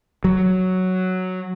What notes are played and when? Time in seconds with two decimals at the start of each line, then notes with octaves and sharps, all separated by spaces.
0.24 F#3